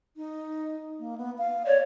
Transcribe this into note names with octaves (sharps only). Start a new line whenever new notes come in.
D#4
A#3
B3
F5
C#5 D5